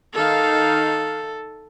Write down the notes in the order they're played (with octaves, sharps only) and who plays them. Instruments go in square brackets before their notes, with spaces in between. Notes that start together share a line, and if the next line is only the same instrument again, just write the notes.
[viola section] D#3 D#4 F5 [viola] A4